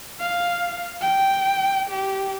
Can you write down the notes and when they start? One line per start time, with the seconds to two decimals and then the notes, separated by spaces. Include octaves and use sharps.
0.20 F5
1.01 G5
1.90 G4